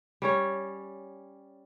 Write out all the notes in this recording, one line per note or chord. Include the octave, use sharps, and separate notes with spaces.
G3 C#4 C#5